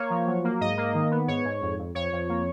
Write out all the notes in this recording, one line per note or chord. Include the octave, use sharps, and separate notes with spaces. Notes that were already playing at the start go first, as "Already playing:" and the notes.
Already playing: A#3 C#5
F3
F#3
A#3
G#2 D#5
A#3
D#3
B3
G#2 C#5
G#2
F2
F2
F2 C#5
F2
A#3